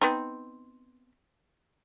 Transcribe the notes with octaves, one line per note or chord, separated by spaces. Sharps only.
B3 C4 D#4